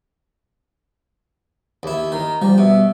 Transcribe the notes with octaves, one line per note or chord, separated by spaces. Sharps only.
D#2 E4
D#3 A#5
F3 G3 G4
B2 E5